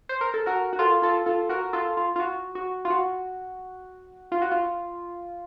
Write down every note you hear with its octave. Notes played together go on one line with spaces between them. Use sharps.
C5
A#4
A4
F#4 A#4
F#4
F4 A4
F4 A4
F4 A4
F#4 A#4
F4 A4
F4
F4
F#4
F#4
F4
F#4
F4
F#4
F4